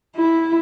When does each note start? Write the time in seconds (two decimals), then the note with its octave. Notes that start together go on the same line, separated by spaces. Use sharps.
0.16 E4